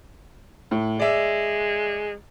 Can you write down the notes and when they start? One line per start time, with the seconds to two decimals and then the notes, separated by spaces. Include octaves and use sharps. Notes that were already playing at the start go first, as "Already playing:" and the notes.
0.71 A2
0.99 G#3 D5 E5